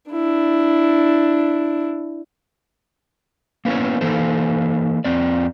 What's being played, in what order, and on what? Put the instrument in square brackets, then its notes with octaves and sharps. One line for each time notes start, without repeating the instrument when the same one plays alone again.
[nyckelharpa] D4 E4
[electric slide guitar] A#3 B3 C#4 E4 C#5
E3 A#3 D#4 A4 C5
F2 C4 D5